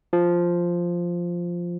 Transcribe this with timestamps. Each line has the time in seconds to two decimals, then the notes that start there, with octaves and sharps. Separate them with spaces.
0.13 F3